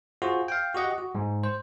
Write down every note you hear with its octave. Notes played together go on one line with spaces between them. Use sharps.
F4 F#4 G#4 C5
F5 G5
F#4 G4 D#5 F#5
F#4
G#2
C5